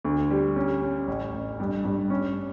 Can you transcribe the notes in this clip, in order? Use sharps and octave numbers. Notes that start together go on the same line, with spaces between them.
D2
G3
C#4
C#4
A1
A1
G2
G2
C#4